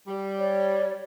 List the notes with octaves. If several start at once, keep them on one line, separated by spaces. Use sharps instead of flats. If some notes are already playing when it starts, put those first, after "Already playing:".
G3
C#5 D5